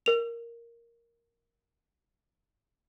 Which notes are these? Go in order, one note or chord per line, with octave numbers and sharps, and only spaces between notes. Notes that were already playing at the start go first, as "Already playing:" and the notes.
A#4 F7